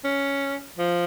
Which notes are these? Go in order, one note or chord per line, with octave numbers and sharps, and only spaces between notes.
C#4
F3